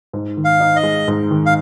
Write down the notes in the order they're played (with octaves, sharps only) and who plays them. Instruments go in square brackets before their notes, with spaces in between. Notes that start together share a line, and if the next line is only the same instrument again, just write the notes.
[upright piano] G#2
D#3
[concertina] F5
[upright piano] D#4
[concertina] D#5
[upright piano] G#3
G#2
D#3
[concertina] F5